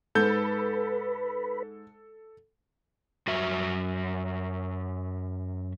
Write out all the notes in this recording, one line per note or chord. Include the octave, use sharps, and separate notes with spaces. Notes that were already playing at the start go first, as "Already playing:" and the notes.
G#2 A4 B4 G6
F#2 F#4 E5